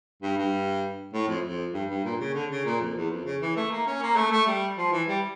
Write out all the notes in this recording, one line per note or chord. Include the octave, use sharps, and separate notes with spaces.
G2
G2
A2
F2
F2
G2
G2
A#2
C#3
D3
C#3
A#2
F2
E2
F2
C#3
E3
A3
A#3
C#4
A#3
A3
A3
G3
F3
E3
G3